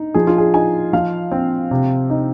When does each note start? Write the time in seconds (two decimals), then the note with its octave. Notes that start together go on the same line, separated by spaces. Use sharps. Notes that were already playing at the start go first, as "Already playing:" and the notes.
Already playing: D#4
0.14 F3 G#4
0.27 F4
0.38 G#4
0.54 D#4 G#5
0.93 F3 F5
1.31 C4
1.71 C3
2.10 D#4